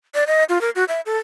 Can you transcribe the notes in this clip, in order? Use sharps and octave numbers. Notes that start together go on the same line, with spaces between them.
D5
D#5
F4
A#4
F#4
E5
A4